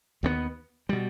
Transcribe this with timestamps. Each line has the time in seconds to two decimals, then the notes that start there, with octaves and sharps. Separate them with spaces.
0.23 D#2 D#3 G3 B3
0.89 B2 G3